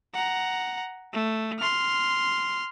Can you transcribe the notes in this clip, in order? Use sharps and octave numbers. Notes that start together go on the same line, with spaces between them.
F#5 A#5
A3
C6 F6